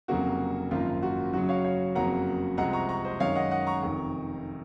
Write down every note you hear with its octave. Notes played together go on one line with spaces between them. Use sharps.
F1 F2 C#3 F#3 A#3 F#4
G#1 F#2 F3 A#3 F4
F#4
F#2 C#3 F#3 F#4
C#5 F5
C#5 F5
F#1 F2 C#3 F#3 A#3 F#5 A#5
C2 C3 F3 G#3 F#5 A#5
A#5 C#6
A#5 C#6
C5 D#5
F#2 D#3 G#3 C#5 F5
D#5 F#5
D#5 F#5
A#5 C#6
F1 F2 D#3